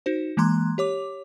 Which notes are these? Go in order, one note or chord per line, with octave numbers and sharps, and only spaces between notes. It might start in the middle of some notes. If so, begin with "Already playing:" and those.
D#4 F#4 C5
E3 G#3 A#3 A#5 C6 F#6
G4 C#5 D6